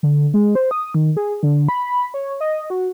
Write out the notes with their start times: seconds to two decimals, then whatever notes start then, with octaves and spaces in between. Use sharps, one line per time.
0.03 D3
0.34 G#3
0.55 C5
0.71 D#6
0.94 D#3
1.17 G#4
1.43 D3
1.69 B5
2.14 C#5
2.41 D#5
2.70 F#4